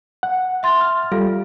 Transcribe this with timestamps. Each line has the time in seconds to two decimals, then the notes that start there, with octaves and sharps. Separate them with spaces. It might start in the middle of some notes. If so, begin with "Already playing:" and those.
0.23 F#5
0.63 E5 C6 A6
0.81 F6
1.12 G3 F4 A4 F5